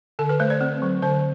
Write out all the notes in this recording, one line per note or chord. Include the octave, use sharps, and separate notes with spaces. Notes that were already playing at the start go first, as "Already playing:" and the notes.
D3 A4
B4
A3 C5
D5
C4
F#3
D3 C5